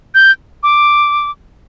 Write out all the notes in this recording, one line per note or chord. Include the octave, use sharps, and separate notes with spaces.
G6
D6